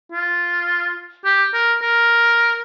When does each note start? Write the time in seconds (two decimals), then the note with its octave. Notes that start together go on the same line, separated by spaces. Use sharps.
0.12 F4
1.25 G4
1.54 A#4
1.82 A#4